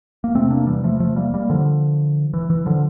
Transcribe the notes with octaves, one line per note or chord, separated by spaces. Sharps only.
A#3
E2 C3 A3 C4
A#3 D4
E3 G3
F3 A3
F3 A3
G3 A#3
G3 A#3
D3 F3
E3
E3
D3 F3